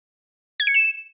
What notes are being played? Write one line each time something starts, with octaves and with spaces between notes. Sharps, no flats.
G#6
C#7
E7